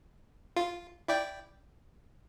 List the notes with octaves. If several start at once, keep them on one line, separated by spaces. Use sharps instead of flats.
F4
E4 D5 G5